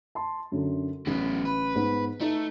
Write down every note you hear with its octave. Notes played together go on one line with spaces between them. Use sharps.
A5 C6
F#2 D3
A1 F#2 B3
B4
G#2 B3
A3 D#4